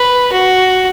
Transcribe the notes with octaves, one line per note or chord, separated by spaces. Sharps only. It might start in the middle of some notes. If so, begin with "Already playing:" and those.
Already playing: B4
F#4